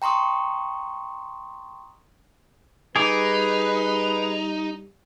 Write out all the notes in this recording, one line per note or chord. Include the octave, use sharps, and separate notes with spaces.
G5 A#5 C6 C#6 D#6
G3 D#4 G#4 B4 D6